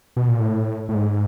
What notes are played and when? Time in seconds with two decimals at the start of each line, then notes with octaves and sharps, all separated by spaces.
0.16 B2
0.28 A#2
0.40 A2
0.89 A2
0.94 G#2